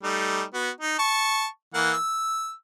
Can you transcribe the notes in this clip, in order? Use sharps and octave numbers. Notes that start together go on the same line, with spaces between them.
G3 A3 D#4
B3 F#4
D#4
A5 C#6
E3 A#3 F#5
E6